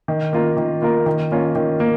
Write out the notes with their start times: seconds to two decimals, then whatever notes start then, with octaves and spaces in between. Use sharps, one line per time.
0.08 D#3
0.33 A#3 F4 A#4
0.57 D#3
0.82 A#3 F4 A#4
1.06 D#3
1.32 A#3 C#4 F4
1.55 D#3
1.80 A#3